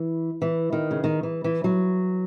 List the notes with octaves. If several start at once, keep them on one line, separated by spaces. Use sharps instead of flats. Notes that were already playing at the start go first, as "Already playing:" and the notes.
Already playing: E3
E3
D#3
C#3
D#3
E3
E3
F#3